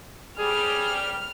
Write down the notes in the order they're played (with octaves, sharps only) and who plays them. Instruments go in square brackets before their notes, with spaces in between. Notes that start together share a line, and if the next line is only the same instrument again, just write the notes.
[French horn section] G3 [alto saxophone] G#4 [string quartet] F6